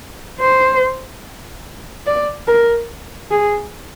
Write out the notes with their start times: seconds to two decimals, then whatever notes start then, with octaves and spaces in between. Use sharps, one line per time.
0.40 C5
2.06 D5
2.48 A#4
3.31 G#4